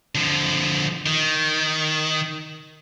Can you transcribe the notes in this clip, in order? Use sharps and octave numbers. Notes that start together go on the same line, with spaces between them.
D3 F3
D#3